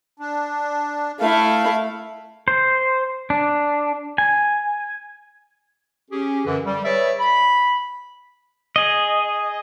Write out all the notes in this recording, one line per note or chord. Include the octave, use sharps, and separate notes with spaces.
D4
A3 E4 F5
C5
D4
G#5
C#4 G4 G#4
F#2 D3 E3
G3
G#4 B4 C#5 D5 E5
B5
G#4 D#5